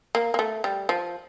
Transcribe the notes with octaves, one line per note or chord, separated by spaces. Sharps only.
A#3
A#3
A3
G3
F3